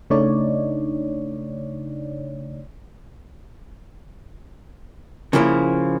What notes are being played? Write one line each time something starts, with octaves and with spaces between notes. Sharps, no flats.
C#3 A3 D4 D#4 C#5 D5
C#3 F3 A#3 E4